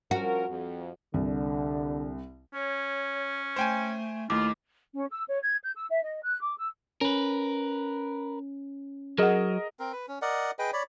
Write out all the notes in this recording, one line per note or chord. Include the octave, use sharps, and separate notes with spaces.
F3 C#4 F#4 A#4
F2
C2 D3
C#4 C#5
A3 C5 G5 G#5
D#2 A3 E4 F4 D6
C#4
E6
C#5
G#6
G6
E6
E5
D#5
F#6
D6
E6
C#4 A#4 B4
F#3 G#4 A#4 D#5 F#5
C4 A#4
B4
C#4
A#4 D5 D#5 F#5
G#4 B4 D#5 G5
C#5 D5 B5